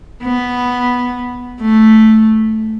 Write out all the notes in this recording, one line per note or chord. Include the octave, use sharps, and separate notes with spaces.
B3
A3